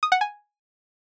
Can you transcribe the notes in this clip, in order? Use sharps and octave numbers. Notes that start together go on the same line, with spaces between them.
D#6
F#5
G#5